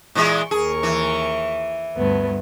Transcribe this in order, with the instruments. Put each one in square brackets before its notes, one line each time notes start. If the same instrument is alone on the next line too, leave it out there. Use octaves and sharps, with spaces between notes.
[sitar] A#2 E3 G#3
[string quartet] D#2 A#4 C#6 [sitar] G#4
[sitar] E3
[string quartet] D2 G2 B3